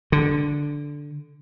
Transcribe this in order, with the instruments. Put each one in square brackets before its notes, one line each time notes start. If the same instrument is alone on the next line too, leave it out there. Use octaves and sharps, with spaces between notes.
[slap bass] D3